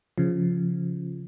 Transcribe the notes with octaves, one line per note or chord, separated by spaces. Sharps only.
C#3 F3